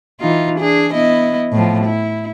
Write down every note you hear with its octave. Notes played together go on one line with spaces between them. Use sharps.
E3 D#4 F4
D4 G#4
B3 E4 D#5
A2 F3
E4